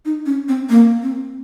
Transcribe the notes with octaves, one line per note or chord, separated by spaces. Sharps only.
D#4
C#4
C4
A#3
C4